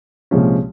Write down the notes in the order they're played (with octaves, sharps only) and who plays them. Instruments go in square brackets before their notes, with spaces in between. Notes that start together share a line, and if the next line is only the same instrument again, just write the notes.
[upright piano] C2 A#2 F3 G#3 C#4